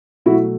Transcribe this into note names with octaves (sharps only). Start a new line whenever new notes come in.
B2 F#3 A3 E4 F#4